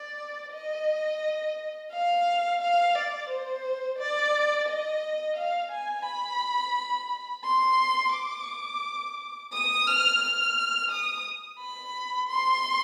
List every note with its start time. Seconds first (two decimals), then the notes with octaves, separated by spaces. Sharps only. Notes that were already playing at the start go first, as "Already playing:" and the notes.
Already playing: D5
0.53 D#5
1.92 F5
2.61 F5
2.95 D5
3.30 C5
3.99 D5
4.68 D#5
5.37 F5
5.72 G#5
6.06 B5
7.45 C6
8.14 D6
9.53 D#6
9.87 F6
10.22 F6
10.91 D#6
11.60 B5
12.29 C6